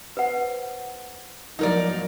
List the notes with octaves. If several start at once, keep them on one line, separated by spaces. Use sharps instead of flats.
B4 C5 F#5
F3 F#3 A#3 D#4 A#4 D5